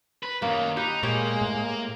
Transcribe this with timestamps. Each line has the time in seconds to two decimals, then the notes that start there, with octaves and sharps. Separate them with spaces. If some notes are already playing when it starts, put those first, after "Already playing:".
0.23 B4
0.42 F#2 D#3 A#3
0.77 D#4 G4 B4
1.03 A#2 G#3 A#3 G4 C#5 D5
1.41 A2